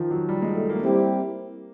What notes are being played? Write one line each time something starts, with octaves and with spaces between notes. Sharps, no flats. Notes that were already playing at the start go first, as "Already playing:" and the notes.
Already playing: D#3 F3
F#3
G3
G#3
A3
A#3
G3 C4 E4 G4